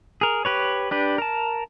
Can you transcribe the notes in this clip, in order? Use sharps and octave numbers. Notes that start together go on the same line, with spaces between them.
G#4 A#4
G4 B4 C#5
D4 G4 B4
A#4 A5